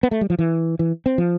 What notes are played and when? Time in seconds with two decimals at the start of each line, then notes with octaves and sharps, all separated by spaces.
0.03 B3
0.11 A3
0.21 G3
0.30 F3
0.39 E3
0.79 E3
1.06 C4
1.18 F3